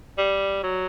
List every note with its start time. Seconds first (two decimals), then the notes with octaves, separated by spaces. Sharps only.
0.18 G3
0.63 F#3